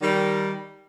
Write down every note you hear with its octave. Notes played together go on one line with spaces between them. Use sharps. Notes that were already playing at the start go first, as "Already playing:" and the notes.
D#3 G3